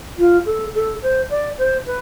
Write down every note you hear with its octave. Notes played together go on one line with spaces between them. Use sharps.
F4
A4
A4
C5
D5
C5
B4